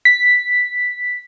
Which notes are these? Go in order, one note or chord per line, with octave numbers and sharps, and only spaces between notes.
B6